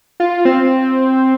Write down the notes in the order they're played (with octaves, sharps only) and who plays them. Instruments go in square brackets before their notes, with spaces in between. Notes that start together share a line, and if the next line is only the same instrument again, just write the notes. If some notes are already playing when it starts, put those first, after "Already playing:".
[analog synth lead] F4
C4